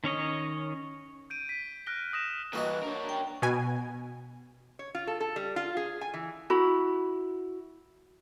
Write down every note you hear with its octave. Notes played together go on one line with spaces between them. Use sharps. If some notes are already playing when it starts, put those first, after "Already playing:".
D#3 C#4 C#5 D#5
G6 D7 D#7
B6
F6 F#6 A#6 D7 G7
D#6 A#6 E7
G2 E3 A#3 F#4 B4 D#5
D4 A#4 C#5
G5
B2 G#5
C#5
F4
A4
A4
G3
F4
G#4
G#5
E3
E4 F#4 B5